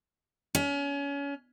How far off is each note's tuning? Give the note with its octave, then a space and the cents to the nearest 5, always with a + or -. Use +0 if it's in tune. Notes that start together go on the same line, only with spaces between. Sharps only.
C#4 +30